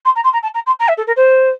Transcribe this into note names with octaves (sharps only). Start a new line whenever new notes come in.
C6
A#5
C6
A#5
A5
A#5
C6
A#5
E5
A4
A#4
C5